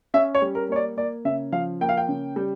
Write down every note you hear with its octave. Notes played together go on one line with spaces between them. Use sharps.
C#4 E5
C#5
G3
A#4
A#3 C#5
D5
A#3 D5
C#3 E5
F3 F5
A#3 G5
F5
G5
C#3
G3